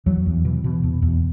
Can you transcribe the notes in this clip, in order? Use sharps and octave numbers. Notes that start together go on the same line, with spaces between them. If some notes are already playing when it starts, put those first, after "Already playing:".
E2 F#3
E2
B2 E3
B2
E2
E2